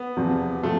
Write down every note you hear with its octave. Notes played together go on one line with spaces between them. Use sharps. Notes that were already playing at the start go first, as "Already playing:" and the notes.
Already playing: B3
E2 C3 F3 C4
C3 F3 A3